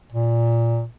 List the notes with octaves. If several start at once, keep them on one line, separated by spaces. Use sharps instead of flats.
A#2